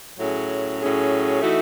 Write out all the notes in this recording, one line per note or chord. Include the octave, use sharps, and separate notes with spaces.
A2 F#3 C#4 G#4
A2 F#3 C#4 G#4
E3 A3 D#4 F#4